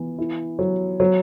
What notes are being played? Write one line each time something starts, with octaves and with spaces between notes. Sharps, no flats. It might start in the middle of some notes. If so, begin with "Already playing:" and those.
Already playing: E3 B3
E4
F#3
F#3